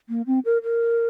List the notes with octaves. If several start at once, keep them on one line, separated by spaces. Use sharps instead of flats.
A#3
C4
A#4
A#4